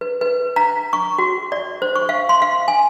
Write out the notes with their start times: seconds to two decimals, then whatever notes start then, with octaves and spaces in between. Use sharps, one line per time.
0.01 B4
0.21 B4
0.56 A#5
0.93 C#6
1.18 F#4
1.52 D5
1.82 C5
1.96 C#6
2.09 F5
2.29 C6
2.42 F5
2.68 G#5